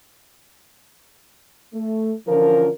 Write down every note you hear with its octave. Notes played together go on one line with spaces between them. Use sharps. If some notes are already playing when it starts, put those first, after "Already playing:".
A3
D3 E3 F3 C#4 F4 A#4